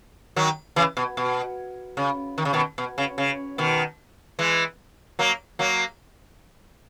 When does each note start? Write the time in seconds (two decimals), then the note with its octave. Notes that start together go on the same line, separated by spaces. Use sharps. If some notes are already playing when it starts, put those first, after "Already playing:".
0.36 D#3 F#3
0.76 C#3 E3
0.97 B2
1.17 B2
1.97 C#3
2.38 D#3
2.45 C#3
2.53 B2 D#3
2.78 B2
2.98 C#3
3.18 C#3
3.58 B2 D#3
4.39 E3 G#3
5.19 F#3 A#3
5.59 F#3 A#3